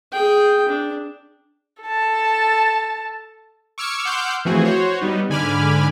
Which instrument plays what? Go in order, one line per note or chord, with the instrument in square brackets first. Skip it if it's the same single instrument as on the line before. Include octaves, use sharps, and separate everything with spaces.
[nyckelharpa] G#4 G5
D4
[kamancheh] A4 A5
[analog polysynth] C#6 D6 E6 F6 G#6 C#7
F#5 C6 D6 E6 F6 G6
E3 F3 A3 C4 F#4 G#4
F#4 C5 C#5
G3 B3 D#4
G#2 D3 G#5 B5 D6 F6